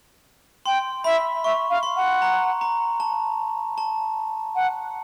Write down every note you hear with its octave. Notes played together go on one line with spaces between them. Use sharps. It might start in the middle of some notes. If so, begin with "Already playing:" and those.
G5 C6
E5 B5
E5 C#6
F5
C6
F#5
A#5
A#5
A5
A5
F#5